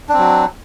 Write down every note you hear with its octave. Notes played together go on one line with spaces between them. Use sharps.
F#3 C4 D4